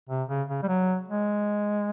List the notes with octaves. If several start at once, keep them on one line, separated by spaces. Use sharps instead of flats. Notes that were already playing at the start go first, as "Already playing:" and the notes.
C3
C#3
C#3
G3
F#3
G#3